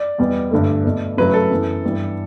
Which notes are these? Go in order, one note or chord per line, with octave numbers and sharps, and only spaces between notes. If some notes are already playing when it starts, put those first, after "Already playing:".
Already playing: D5
E2 B2 G3 B3
G2 D3 A3
B2 A3
C#3 F#3 A3 B4
A4
F#2 E3 B3
G2 E3 G3 B3